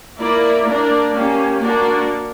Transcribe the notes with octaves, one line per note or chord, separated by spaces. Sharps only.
A#3 E4 A#4 D5
A#3 D4 A#4 D5
A#3 C#4 G4
A#3 D4 F#4 A#4 D5